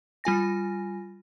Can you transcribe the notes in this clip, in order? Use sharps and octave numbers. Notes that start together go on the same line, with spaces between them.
G3 F4 G#5 A#6